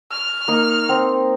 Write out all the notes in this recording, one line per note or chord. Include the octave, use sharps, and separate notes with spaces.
F6
A#3 D#4
C4